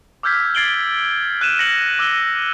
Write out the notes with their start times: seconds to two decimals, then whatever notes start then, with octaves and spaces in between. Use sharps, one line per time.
0.23 D6 E6 F6 G6 G#6 B6
0.55 G#6 A6 C7 D7 F#7 G7
1.41 F#6 D#7 E7
1.59 A#6 C#7 F#7
1.99 D6 E6 D#7 G7